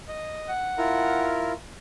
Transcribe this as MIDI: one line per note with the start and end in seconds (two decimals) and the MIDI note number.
0.08 0.50 75
0.49 1.32 78
0.78 1.52 64
0.78 1.52 65
0.78 1.52 70